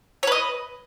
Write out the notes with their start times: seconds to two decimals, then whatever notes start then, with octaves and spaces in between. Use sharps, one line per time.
0.23 C#5
0.27 B4
0.32 D#5